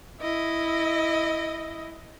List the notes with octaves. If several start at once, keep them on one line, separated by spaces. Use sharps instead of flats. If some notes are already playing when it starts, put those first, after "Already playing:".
E4 D#5